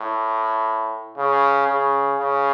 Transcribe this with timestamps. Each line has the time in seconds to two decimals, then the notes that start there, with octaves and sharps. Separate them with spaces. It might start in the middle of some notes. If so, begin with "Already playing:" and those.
Already playing: A2
1.17 C#3
1.67 C#3
2.18 C#3